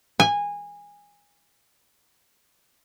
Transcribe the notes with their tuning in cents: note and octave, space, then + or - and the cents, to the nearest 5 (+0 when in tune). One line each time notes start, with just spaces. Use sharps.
G#5 -20